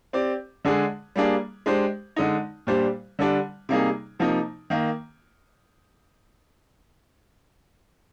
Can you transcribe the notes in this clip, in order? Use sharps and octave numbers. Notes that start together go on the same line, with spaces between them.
C4 G4 D5
D3 G#3 D4 G#4
G3 A#3 D4 G#4
G#3 D4 G4 C5
D3 G#3 D#4
A#2 G3 D4 G4 C5
D3 G3 D4
C3 G3 A#3 D#4 G#4
C3 F3 A#3 D#4
D#3 A#3